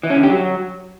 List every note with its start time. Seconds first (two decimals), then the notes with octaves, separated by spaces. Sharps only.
0.03 E3
0.10 C#4
0.17 D3
0.23 G4
0.30 F#3